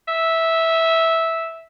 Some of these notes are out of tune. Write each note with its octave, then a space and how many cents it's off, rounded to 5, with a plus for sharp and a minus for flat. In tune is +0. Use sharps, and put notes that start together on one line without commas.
E5 -10